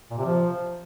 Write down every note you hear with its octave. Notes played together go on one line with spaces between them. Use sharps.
A#2
C3
F3